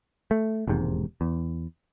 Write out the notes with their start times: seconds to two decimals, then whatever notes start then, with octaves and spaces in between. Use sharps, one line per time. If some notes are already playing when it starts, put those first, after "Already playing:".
0.31 A3
0.68 E1 D#2 G#2 C3
1.21 E2